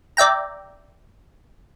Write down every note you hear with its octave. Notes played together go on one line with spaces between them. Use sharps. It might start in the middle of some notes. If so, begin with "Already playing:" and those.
D5 E5 G5 A#5